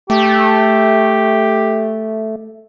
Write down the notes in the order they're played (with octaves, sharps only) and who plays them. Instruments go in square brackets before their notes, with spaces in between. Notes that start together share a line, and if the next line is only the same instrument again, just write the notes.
[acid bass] A3 [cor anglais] G4